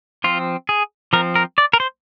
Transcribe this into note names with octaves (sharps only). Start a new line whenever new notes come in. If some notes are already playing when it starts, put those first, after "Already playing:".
F3 C4 F4
G#4
F3 C4 A#4
A#4
D5
A#4
C5